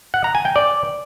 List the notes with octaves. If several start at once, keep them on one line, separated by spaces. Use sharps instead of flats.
F#5
A#5
G#5
G5
D5